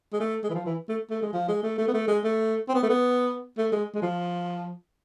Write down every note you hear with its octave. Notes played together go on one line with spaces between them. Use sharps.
G#3
A3
G#3
E3
F3
E3
A3
A3
G#3
F3
G#3
A3
A3
B3
A3
G#3
A3
C4
B3
A3
B3
A3
G#3
G#3
F3